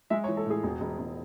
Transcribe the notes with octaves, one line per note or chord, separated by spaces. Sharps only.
G#3 E5
C#5
E3
A4
A2 G#4
E1
E1
E1